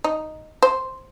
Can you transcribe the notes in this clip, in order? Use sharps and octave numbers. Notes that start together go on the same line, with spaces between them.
D#4
C5